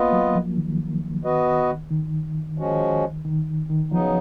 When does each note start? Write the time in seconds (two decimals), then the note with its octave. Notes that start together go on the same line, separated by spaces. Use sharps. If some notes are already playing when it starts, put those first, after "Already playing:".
Already playing: A#3 B3 F4 B4 D#5
0.13 F#3
0.35 F3
0.57 D#3
1.24 B3 F#4 B4 D#5
1.91 D#3
2.58 F3 G#3 C#4 F#4
3.25 D#3
3.70 D#3
3.92 C#3 F3 F#3 B3 D#4